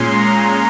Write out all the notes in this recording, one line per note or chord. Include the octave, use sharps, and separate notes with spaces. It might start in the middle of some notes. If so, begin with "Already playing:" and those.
Already playing: A#2 G#3 C#4 C6
A#5